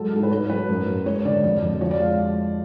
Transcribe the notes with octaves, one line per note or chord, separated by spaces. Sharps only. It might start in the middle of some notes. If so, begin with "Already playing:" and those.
Already playing: F#3 G#3 A4
G#2 A4
B4
G#2 C#5
F#3 B4
F#2
F#2
G#3 C#5
D3 D5
F2 D5
F2
F3 C#5
D5
G#3 F5